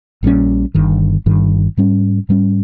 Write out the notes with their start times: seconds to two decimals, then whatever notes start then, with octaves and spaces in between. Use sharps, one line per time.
0.23 A#1 A#2 G3 C#4
0.75 G1 G2 D#3
1.26 G1 G2 D#3
1.77 G#2 G3 C#4
2.29 G#2 G3 C#4